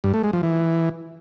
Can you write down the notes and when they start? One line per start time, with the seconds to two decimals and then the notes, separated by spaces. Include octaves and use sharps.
0.04 G2
0.14 A3
0.23 G#3
0.33 F3
0.43 E3